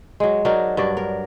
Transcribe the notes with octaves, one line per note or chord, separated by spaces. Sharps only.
F#3 G#3
F#3 D4 D#4 A#4
G2 F#3 D5
A#4